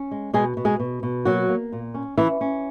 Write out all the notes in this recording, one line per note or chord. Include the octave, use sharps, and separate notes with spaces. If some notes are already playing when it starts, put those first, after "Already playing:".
Already playing: C#4
G#3
B2 G#3 G#4
B2
G#3 G#4
B2
B2
F#3 A#3 F#4
A#3
A#2
C#4
E3 C#4 E4
C#4